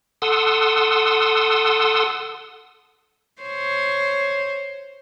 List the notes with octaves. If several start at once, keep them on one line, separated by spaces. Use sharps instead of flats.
A4 F#5 C6 D#6 E6
C5 C#5